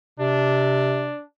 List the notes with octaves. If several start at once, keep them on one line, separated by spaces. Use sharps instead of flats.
C3 D4